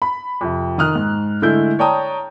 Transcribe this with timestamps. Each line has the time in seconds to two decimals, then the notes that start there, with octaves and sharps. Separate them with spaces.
0.02 B5
0.41 F2 C3
0.78 D#3 D#6 F6 F#6
0.95 G#2
1.42 D3 G#3 A3 E4 G6
1.79 C#5 D5 G5 A5 A#5 D#6